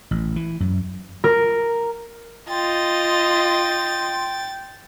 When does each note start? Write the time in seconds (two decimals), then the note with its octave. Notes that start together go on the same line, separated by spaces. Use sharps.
0.11 A1
0.36 E3
0.60 F#2
1.24 A#4
2.49 F4 D#5 G5 C6 A6